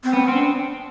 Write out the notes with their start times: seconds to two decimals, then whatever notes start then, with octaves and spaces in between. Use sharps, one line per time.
0.04 C4
0.14 B3 C#4
0.28 C4 D4